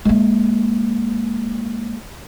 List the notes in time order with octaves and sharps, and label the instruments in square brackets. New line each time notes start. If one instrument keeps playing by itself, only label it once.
[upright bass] G#3 A#3